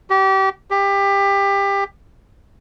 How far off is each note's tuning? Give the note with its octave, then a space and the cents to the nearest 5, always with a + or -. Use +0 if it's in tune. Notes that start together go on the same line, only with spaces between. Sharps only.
G4 -30
G4 +20